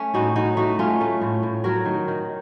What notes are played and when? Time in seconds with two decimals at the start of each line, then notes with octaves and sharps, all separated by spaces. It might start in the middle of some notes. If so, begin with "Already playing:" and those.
Already playing: A3 C#4
0.14 A2 D#4 F#4
0.36 A2 D#4 F#4
0.57 A3 D#4 F#4
0.79 A3 C#4 F4
1.01 A3
1.21 A2
1.43 A2
1.64 F#3 F#4 A#4
1.86 D#3
2.08 D#3